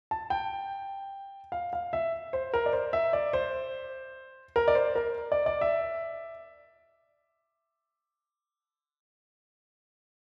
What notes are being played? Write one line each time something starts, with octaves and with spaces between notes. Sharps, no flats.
A5
G5
F5
F5
E5
C5
A#4
D5
C5
E5
D5
C5
A#4
D5
C5
A#4
D5
D5
E5